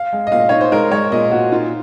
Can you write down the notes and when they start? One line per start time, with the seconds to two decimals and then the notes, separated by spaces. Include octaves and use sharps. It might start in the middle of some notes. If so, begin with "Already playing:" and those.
Already playing: F5
0.13 G#3
0.27 D#5
0.32 A#2 F5
0.49 D#4 C#5
0.61 C5
0.72 G#3 A#4
0.91 G#3 C#5
1.12 A#2 D#5
1.31 A#2 F#4
1.52 D#4 F4